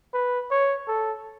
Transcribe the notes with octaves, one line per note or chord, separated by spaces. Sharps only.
B4
C#5
A4